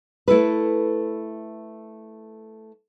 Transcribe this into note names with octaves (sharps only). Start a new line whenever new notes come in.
A3 E4 A4 B4